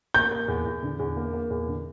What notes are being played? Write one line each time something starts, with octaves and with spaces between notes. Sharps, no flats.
A#3 G6
A#3
E2
E2
D3
E2
A#3
A#3
E2
D3